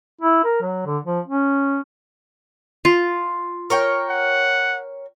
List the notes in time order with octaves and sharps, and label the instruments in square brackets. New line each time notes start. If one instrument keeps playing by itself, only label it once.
[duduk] E4
A#4
F#3
D3
F3
C#4
[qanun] F4
[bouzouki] A#4 C#5 G5
[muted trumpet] F#5